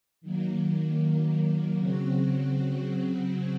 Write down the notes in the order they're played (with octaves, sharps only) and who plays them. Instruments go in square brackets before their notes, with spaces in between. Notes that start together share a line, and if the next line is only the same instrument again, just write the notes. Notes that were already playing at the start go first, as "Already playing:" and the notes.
[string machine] D#3 F#3 A#3
C#3 F#3 C4 F#4